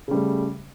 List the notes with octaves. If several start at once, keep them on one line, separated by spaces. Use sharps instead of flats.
C#3 G3 A3